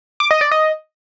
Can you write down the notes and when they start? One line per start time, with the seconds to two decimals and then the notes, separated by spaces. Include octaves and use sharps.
0.20 D6
0.31 D#5
0.41 D5
0.52 D#5